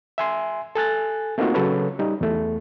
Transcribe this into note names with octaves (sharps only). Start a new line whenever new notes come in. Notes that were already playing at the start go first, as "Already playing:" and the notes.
E5 G#5 C6
A4 G#5 F#6 A6
A3 A#3 C4 D#4 F4 F#4
C#3 F#3 A4 B4 C#5
G3 D#4
E2 A3